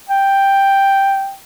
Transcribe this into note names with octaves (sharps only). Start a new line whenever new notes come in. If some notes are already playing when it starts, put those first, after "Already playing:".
G5